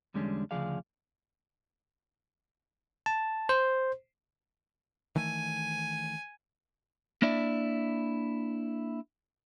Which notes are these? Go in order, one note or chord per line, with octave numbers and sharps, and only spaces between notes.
E2 D3 G3 G#3 C#4 D4
D2 C#3 F3 G#4 D5 F5
A5
C5
D#3 E3 A3 G#5
A#3 D4 E4 D5 E5